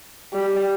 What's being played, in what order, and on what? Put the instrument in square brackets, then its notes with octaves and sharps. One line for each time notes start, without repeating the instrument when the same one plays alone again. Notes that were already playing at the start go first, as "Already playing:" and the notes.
[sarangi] G3